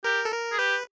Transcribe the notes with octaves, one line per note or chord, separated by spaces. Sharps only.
G4 A#4
A4
A#4
G#4
G4 B4